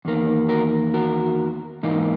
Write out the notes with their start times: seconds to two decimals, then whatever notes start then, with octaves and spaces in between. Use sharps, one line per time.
0.05 E2 D#3 A#3
0.49 F#4 A#4
0.94 F#4 A#4
1.83 G#2 E3 A#3 D#4